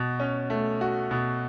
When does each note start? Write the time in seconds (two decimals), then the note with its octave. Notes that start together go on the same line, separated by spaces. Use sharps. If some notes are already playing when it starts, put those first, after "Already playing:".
Already playing: B2 F#4
0.20 C#4
0.50 A3
0.81 F#4
1.11 B2